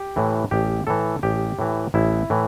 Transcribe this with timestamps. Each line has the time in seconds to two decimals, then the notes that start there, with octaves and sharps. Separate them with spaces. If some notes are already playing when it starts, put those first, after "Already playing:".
Already playing: G4
0.16 A2 E3
0.51 A1 G4
0.87 A2 E3 A4
1.23 A1 G4
1.59 A2 E3
1.94 A1 E4
2.30 A2 E3